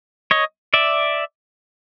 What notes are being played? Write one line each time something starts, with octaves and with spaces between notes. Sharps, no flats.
C#5 D#5
D5 E5